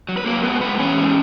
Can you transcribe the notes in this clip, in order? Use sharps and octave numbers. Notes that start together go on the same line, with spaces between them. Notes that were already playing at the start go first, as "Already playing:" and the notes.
F#3
B4
F#3 A#3 A#4
G#2 B3 B4
G#3 B3 B4
E3 C#4 C#5
G#3